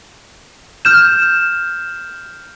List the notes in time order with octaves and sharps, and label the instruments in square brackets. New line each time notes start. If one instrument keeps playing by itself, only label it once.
[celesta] F6 G6 E7